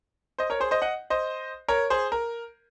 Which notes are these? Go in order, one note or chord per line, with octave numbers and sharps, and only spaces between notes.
C5 D#5
A#4 C#5
G#4 C5
C5 D#5
D#5 F#5
C5 D#5
A#4 C#5
G#4 C5
A#4